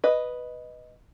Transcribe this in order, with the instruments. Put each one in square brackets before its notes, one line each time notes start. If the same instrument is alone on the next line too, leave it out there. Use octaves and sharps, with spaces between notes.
[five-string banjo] B4 D#5